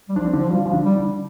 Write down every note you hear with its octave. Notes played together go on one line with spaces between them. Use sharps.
G3
F3 D4
C4
D3 D4
F3
G3 F4
F3 F4
D3 D4
G3
D3 D4